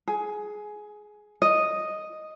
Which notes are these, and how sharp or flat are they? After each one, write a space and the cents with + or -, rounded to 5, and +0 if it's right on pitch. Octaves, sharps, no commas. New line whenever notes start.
G#4 +15
D#5 +0